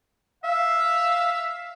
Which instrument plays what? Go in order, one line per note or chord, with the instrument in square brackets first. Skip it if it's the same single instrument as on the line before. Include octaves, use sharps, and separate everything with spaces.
[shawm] E5 [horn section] F5